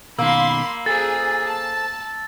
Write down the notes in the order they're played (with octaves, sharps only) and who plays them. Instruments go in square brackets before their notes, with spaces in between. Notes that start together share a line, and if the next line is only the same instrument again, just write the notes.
[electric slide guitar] B2 D#3 [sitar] A#3 [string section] B5 C6 [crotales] E6
[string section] G#4 [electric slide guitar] A4 C5 [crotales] A6
[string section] A5